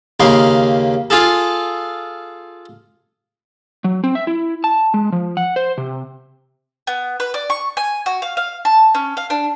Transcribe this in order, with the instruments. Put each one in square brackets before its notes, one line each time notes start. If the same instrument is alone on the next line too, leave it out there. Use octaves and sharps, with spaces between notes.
[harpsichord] D#2 C#3 A#3 C6
F4 G#4 A4
[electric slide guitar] F#3
C4
E5
E4
A5
G#3
F3
F#5
C5
C3
[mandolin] B3
B4
D5
C#6
G#5
F#4
F5
F5
A5
C#4
F5
D4